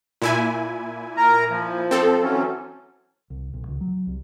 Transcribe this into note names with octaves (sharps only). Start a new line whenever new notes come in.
A#2 E4 G#5
A#4 A#5
F3
C4 A4
E3 F#3 C#4
C2
B1
C#2
F#3
C2